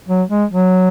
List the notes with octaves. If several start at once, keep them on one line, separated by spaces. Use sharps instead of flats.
F#3
G#3
F#3